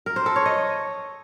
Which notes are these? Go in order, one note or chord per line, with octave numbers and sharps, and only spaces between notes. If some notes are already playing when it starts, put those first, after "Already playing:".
A#4
C5
A4
C#5
D#5